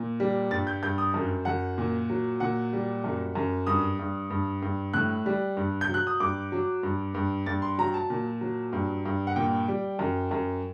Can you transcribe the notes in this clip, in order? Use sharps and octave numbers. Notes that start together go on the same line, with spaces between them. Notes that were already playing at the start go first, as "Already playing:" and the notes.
Already playing: A#2
G3
G2 A6
G6
G2 G6
D#6
F#2
F#2 F#5
A#2
F#3
A#2 F#5
G3
F#2
F#2
G2 D#6
G2
G2
G2
A2 F#6
G3
G2
G6
F#3 F#6
D#6
G2 D6
F#3
G2
G2
G2 A6
C6
F#3 A#5
A5
A#2
F#3
G2
G2
F#5
A#2 G5
G3
F#2
F#2